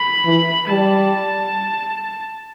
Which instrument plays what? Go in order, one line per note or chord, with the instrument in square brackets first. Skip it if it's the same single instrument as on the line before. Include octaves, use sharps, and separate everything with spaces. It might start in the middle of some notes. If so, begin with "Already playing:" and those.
Already playing: [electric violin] B5
[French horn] E3
[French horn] G3 [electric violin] A5